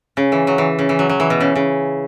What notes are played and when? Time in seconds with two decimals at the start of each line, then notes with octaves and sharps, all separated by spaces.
0.17 C#3
0.32 E3
0.47 F#3
0.58 E3
0.79 C#3
0.89 E3
0.99 F#3
1.09 F#3
1.20 E3
1.30 B2
1.40 C#3
1.55 C#3